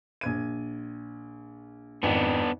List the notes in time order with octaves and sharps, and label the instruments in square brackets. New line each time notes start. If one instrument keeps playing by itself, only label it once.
[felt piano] A#1 G#6 D#7
[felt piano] G#1 F2 F#5 [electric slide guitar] B3 D4